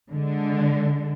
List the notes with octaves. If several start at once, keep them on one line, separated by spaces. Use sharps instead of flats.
D3 G#3